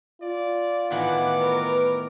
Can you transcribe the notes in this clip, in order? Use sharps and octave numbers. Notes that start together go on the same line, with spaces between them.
F4 D5
A2 D#3 E3 B3 F#5 D6
A#4 B4